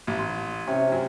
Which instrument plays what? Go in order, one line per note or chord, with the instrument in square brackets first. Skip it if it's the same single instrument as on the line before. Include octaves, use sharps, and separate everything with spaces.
[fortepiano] A1
[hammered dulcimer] C6
[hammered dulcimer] C3 [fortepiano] C#4
[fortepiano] F#2